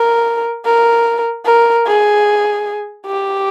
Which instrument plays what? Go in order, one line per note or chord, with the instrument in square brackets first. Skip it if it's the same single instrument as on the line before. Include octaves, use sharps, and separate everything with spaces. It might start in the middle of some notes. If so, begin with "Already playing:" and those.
Already playing: [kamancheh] A#4
A#4
A#4
G#4
G4